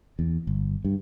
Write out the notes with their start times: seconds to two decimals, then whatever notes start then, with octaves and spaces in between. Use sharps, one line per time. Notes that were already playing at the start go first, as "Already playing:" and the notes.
0.19 E2
0.47 G1
0.85 G2